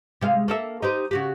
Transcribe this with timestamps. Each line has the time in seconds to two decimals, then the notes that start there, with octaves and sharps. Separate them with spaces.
0.21 C3 G#3 F5
0.48 A#3 A4 E5
0.82 D#4 G4 C5
1.11 C#3 F#4 G4